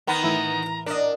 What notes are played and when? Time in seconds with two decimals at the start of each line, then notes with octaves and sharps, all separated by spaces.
0.07 D#3 B3 A#5
0.23 A2 E3 E4
0.63 B3 A#4
0.86 A#2 D4 A#4 D5 D#5 F#5